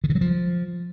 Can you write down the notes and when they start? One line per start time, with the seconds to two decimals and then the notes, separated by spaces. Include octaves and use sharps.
0.04 D#3
0.10 C#3
0.15 F#3
0.21 F3